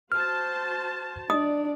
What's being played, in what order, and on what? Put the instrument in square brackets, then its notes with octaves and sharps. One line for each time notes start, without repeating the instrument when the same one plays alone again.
[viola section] F#4 C5 A5 [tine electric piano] F6
[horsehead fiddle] D4 D5 [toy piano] D#5 D#6